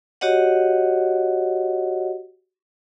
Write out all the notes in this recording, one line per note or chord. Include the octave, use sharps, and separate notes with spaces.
F#4 G4 C#5 D#5 F#5